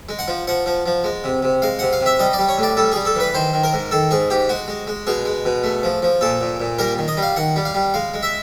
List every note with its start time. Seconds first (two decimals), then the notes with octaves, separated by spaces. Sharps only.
0.09 G#3
0.19 F#5
0.28 F3
0.47 F3 F#5
0.66 F3
0.86 F3
1.04 G#3
1.24 C3
1.43 C3
1.62 G#3 F5
1.79 C3 F#5
1.93 F5
2.01 C3
2.06 E5
2.19 G3 D#5
2.33 D5
2.39 G3
2.49 C#5
2.58 A2
2.63 D5
2.77 G3 A4
2.92 G3 G#4
3.05 A4
3.16 E3 B4
3.34 D#3 C5
3.53 D#3
3.63 A#4
3.73 G#2
3.91 D#3 A4
4.11 G#2 G#4
4.30 G#2 G4
4.49 G#3 F#4
4.68 G#3
4.87 G#3
5.07 B2 G#4
5.25 G#3
5.45 B2
5.64 A3
5.83 F3
6.02 F3
6.21 A#2 A4
6.41 A#2
6.60 A#2
6.79 G3 A#4
6.98 D#3
7.08 D#5
7.17 G3
7.22 F5
7.36 D#3 F#5
7.56 G3
7.65 F5
7.74 G3
7.94 G#3 F5
8.14 G#3
8.23 E5